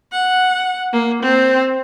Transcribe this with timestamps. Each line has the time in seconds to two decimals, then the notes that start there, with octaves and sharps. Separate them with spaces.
0.12 F#5
0.93 A#3
1.23 C4